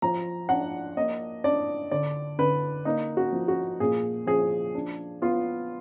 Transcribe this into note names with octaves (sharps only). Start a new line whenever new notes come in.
F3 A#5
D4 F#5
A#3 D#5
D4 D5
D3 D5
D3 B4
A#3 D#4
F#4
F3
F#4
A#2 G#4
F3 G#4
D4
B3 F4